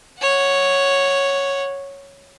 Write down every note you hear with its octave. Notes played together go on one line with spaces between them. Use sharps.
C#5 F#5